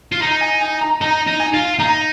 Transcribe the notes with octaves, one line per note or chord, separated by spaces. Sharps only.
F4
D#4 A#5
G#5
G#5
A#5
D#4 A#5
D#4
G#5
F4
D#4 A#5